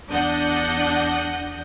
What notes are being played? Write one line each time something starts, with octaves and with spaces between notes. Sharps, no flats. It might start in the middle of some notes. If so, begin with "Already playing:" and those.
E2 D4 F#5 D#6 G6 A#6